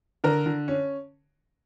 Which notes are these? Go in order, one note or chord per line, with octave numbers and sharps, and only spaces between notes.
D3 A#4
D3
C#4